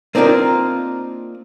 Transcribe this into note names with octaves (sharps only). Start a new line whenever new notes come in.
A#3 C4 D4 D#4 F4 A#4